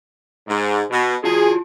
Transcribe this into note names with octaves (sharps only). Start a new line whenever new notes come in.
G#2
B2
F4 F#4 G#4 A5